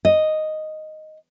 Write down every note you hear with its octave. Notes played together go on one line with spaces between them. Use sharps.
D#5